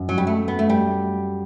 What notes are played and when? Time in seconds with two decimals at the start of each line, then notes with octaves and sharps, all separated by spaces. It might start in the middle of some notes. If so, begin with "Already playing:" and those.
Already playing: F#2
0.09 F#3
0.18 G3
0.27 A3
0.48 B3
0.59 A3
0.69 G3